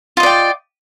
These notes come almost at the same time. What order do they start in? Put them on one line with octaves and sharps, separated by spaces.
F4 D#5 D5 G5